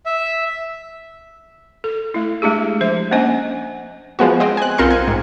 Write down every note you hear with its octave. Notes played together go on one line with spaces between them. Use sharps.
E5
A4
A3 E4
G#3 A3 D4 G4 G#4
F3 C5 E5
A#3 C#4 D4 C5 D#5 G#5
F3 G#3 B3 F#4
C4 C5 D#5
G#5 F#6
B1 C4 F4 A#4 C6 C#7
G#5
G#2